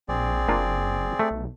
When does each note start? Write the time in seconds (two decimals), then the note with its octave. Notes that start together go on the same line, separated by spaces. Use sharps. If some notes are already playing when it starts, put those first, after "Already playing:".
0.09 A#1 C4 G#4 D5
0.48 F#1 A#3 D4 F4
1.19 A3
1.31 B1